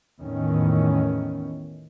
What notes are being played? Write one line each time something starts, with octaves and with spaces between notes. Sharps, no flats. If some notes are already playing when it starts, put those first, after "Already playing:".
E2 A2 D#3 C#4